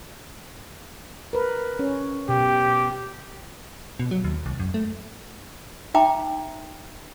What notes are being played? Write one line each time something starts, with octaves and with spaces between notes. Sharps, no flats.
A#4 B4
C#4
B2 G4
B2
F#3
D#2
C2
F#2
A3
D#4 E5 G5 A5 A#5 D6